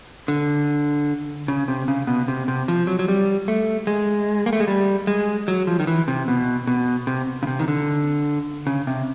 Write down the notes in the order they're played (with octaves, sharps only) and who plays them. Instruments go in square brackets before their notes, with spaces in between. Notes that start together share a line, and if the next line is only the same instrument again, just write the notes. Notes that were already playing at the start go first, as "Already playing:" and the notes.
[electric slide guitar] D3
C#3
C3
C#3
B2
C3
C3
F3
F#3
F#3
G3
A3
G#3
A#3
A3
G#3
G3
G#3
F#3
F3
D#3
E3
C3
B2
B2
C3
C#3
C3
D#3
D3
C#3
C3